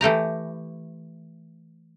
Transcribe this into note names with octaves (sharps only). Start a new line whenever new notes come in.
E3 A3 G4 A#5